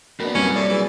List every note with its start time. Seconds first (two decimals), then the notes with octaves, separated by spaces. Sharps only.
0.20 F2 A#3 B3 D4 F#4
0.35 C2 F#2 C3 G3 A#3 C#4
0.56 A2 D5
0.69 E3 F#4 G#4 B4